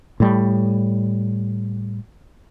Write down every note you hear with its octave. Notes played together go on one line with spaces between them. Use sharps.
A2 G3